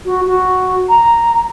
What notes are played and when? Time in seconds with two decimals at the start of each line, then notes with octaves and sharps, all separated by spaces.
0.05 F#4
0.27 F#4
0.89 A#5